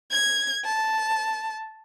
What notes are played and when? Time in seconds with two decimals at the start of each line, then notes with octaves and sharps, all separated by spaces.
0.11 G#6
0.65 A5